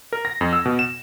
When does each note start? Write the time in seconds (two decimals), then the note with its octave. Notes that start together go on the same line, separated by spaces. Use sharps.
0.13 A#4
0.25 A#6
0.41 F2
0.53 E6
0.65 B2
0.79 E7